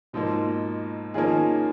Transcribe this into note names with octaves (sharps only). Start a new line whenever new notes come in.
G#2 B2 F3 A#3
D#3 F3 A#3 C#4 F4 G#4